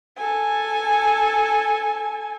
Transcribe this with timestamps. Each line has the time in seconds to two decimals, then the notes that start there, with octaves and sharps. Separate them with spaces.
0.17 A4 G#5